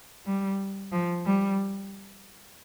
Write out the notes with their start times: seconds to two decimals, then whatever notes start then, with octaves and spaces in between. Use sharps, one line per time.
0.26 G3
0.92 F3
1.25 G3